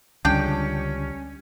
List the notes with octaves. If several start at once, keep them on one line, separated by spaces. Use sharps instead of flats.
C#2 D3 G3 C#4 D4 G5